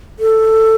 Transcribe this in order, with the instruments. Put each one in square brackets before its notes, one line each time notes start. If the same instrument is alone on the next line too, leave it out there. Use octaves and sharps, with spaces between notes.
[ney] A4